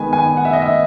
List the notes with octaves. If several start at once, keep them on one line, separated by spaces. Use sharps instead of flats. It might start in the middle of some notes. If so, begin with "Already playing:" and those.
Already playing: D#3 G#3 B3 G#5
G#5
F#5
E5
D#5
E5